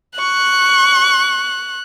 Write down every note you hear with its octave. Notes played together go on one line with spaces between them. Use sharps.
C#6 F#6